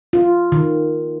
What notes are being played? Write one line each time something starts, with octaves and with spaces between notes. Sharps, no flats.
F4
D#3